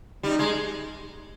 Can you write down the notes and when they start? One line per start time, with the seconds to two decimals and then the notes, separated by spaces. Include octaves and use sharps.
0.23 G3 D#4
0.39 G#3